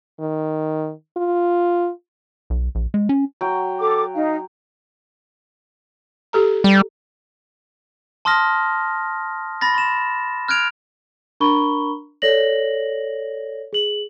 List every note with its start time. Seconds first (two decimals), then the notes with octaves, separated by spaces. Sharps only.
0.20 D#3
1.17 F4
2.50 B1
2.75 A#1
2.94 G#3
3.09 C#4
3.41 F#3 G5
3.78 A4 D6
4.14 D#4 F5
6.33 G4 A4 A#5
6.64 G3
8.25 A5 C6 D#6 F6 A#6
9.61 B5 A6 A#6
9.74 C6 E7
10.48 F6 F#6 G#6 D7 F7
11.40 D4 A#4 A#5 B5 C#6 G7
12.22 A4 C#5 D5 A#6 F#7
13.73 G#4 F#7